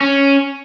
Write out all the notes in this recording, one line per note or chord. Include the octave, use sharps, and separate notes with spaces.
C#4